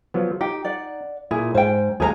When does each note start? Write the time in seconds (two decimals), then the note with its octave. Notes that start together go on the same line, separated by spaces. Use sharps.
0.14 F3 F#3 B3
0.41 D#4 G4
0.65 D5 F#5
1.31 A#2 E4 G#4
1.55 G#2 C5 G5
2.00 D#2 G#3 G#4 A4 A#5